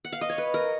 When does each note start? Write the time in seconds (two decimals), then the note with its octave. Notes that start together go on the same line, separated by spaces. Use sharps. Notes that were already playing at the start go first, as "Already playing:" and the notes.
0.05 F#5
0.12 F5
0.21 D#5
0.30 C#5
0.38 B4
0.54 A#4